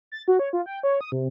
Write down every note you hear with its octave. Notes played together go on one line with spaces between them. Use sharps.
A6
F#4
C#5
F4
G5
C#5
D#6
C3